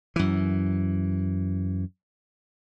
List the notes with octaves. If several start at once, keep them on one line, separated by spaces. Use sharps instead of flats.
F#2 E3